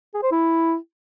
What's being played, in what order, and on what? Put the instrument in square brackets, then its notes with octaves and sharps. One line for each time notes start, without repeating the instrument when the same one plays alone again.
[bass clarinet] G#4
C5
E4